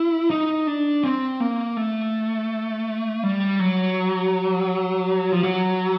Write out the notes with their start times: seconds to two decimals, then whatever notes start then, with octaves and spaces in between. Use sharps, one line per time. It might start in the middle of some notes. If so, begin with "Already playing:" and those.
Already playing: E4
0.30 D#4
0.67 D4
1.03 C4
1.40 A#3
1.77 A3
3.23 G3
3.59 F#3
5.32 F3
5.43 F#3